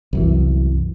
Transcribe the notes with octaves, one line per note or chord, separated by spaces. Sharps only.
C2 F#2 E3